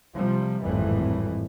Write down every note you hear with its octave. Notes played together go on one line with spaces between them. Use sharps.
C3 F3 G3
G#1 F2 A2 E3 G3